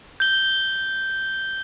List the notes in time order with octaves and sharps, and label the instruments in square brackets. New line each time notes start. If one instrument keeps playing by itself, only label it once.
[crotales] G6 G7